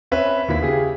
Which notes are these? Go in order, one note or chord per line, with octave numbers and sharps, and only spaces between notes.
C4 C#4 B4 E5
D#2 E4 B6
C#3 G4 G#4